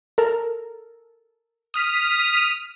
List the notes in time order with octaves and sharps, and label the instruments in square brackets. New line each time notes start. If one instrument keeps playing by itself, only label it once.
[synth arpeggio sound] A4 A#4
[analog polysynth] D#6 F6 B6